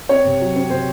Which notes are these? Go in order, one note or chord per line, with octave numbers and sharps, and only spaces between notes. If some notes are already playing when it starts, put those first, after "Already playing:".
C4 C#5
C3
F#3
C4
C3 C5